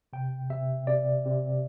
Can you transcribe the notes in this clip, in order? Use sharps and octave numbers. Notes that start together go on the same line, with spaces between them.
C3 G5
C3 E5
C3 D5
C3